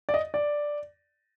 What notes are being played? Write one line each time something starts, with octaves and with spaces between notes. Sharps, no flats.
D5
D#5
D5